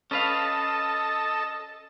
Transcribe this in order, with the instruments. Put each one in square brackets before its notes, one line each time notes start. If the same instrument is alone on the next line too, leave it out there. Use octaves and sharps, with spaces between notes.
[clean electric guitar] C#4 B4 F5 [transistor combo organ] A4 D#5 A5